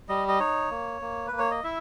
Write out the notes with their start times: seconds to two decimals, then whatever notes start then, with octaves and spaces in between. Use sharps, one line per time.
0.09 G3 D#5
0.28 D#5
0.40 D#4 C#5
0.71 A#3
1.02 A#3
1.27 B4
1.32 A#3
1.39 C#5
1.51 D#5
1.64 E4 E5